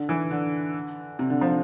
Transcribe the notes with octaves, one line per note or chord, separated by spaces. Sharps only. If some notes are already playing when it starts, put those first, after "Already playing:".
Already playing: D3
E3
D3
C3
D3
F3